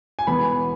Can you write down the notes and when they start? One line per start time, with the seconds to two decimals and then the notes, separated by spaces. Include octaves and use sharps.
0.19 G#5
0.27 E1 E2 E3 B3 B5